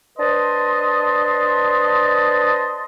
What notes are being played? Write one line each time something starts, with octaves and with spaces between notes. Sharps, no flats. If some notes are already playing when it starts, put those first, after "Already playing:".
D4 B4 C5 D#5 A5 C6